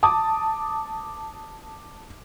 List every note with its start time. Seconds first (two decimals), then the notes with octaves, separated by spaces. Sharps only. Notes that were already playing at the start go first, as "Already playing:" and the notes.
0.03 A5 D6 D#6